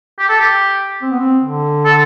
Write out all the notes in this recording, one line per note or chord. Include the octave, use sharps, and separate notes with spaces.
G4
A4
G4
C4
B3
C4
D3
A4